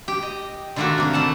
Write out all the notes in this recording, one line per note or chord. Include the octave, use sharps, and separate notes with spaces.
G4
D#5
D3 D#3 A3 A#3 D4 F#4
C3 A#3
E3 A3 F#5 A5